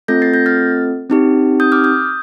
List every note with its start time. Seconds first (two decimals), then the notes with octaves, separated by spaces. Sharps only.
0.08 A3 C4 F4 A4 G6 A#6
0.22 A6 C7
0.34 G6 A#6
0.46 F6 A6
1.10 C4 D#4 G4
1.60 D#6 G6
1.72 D6 F6
1.84 D#6 G6